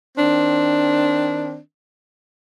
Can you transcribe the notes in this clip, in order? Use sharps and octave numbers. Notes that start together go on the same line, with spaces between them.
D#3 C4 D4